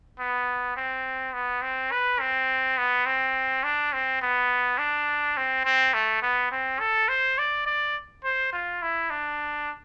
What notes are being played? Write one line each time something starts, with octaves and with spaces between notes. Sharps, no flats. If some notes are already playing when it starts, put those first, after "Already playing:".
B3
C4
B3
C4
B4
C4
B3
C4
D4
C4
B3
D4
C4
C4
A3
B3
C4
A4
C5
D5
D5
C5
F4
E4
D4